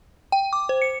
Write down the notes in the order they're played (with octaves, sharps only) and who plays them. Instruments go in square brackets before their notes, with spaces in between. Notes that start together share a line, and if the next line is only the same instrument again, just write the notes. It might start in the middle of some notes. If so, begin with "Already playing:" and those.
[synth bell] G5
D6
C5
C#7